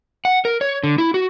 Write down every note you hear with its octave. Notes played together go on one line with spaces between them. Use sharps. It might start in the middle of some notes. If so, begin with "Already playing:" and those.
F#5
A#4
C#5
D3
E4
F#4